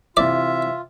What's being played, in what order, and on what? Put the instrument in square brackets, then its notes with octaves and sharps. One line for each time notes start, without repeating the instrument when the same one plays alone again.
[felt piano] C3 E3 [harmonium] F4 [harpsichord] D5 [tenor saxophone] E5